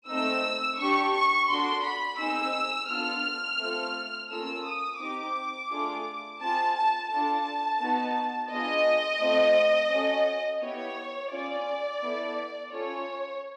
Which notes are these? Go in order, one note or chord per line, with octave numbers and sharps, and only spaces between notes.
A3 C4 D#4 E6
D4 G4 C#6
C#6
D4 F#4 A4 C6
B5
C4 D#4 G#4 E6
B3 D4 F4 A4 F6
A3 C4 F4 A4
A#3 C#4 F4 A4 E6
D#6
C4 D#4 G4 D6
A3 D4 F4 G#4
C4 F4 G#4 A5
A5
D4 F4 A4 A5
B3 D#4 F#4
B3 D4 F4 G#4 D#5
A3 C4 F4
C#4 F#4 A4
B3 E4 G4 C#5
C#4 F4 G#4 D5
B3 E4 A4
C#4 F4 A4 C#5